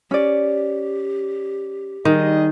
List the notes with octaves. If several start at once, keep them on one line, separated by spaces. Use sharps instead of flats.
C#4 G4 D5
D#3 G3 G#4 D#5